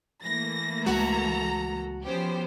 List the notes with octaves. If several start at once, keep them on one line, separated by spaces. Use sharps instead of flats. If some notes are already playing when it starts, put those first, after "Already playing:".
E3 A3 A#3 A#6
C#2 G#3 F#4 A4 A#5
F3 B3 C#4 G4 C5